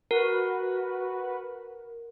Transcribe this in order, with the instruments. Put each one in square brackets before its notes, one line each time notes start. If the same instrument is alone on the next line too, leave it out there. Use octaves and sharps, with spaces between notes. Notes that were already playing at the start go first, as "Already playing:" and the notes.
[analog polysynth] F#4 B4 [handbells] A#4